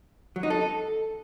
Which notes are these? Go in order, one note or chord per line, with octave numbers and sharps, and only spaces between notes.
F#3
D#4
A4